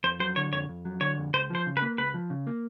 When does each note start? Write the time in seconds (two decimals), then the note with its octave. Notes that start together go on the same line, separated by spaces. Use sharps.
0.03 F2 C5
0.19 F#3 C5
0.36 D3 C#5
0.53 F2 C#5
0.69 F2
0.85 F#3
1.00 D3 C#5
1.18 F2
1.34 C#2 C5
1.50 F3 C5
1.66 C#3
1.77 B4
1.82 A#3
1.98 C#2 B4
2.14 F3
2.30 C#3
2.47 A#3